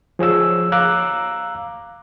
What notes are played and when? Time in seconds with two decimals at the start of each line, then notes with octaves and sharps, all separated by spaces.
0.19 F3 G#4 C#5 E6
0.72 F5 A#5 D6 E6 F#6